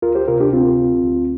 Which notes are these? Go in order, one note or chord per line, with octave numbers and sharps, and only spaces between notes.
D2 F4 A#4
G4 C5
C3 F4 A#4
D4 G4
D2 C4 F4
D2
D2